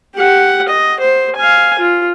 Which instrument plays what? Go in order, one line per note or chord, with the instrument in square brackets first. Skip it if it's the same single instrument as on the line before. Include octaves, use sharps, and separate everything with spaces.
[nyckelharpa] G4 F#5
D#5
C5
F5 G#5
F4